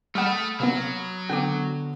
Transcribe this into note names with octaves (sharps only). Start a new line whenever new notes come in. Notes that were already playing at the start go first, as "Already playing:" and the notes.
G3 A3 A4 F#5 B5 D#6 F6
C3 F#3 A#3 B3
D3 B3 F#5 G5 D6